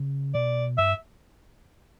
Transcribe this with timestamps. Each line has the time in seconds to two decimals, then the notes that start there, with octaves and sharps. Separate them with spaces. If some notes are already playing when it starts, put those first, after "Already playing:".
Already playing: C#3
0.34 B2 D5
0.78 G2 E5